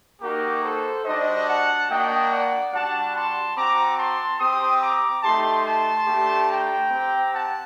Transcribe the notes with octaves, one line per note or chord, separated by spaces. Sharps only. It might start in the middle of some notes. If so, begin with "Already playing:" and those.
A#3 D#4 F#4 G4 A#4
A4 C5
G3 D4 F#4 C5 D#5
F#5 A5
A#3 D4 F#4 D#5 G5
D5 F#5
G3 D4 F#4 F#5 A5
A5 C6
C4 F#4 A#5 D6
A5 C6
C4 G4 C6 D#6
A#5 D6
A3 D#4 G4 A5 C6
A5 C6
A3 D4 G4
G5 A#5
C4 G4
F#5 A5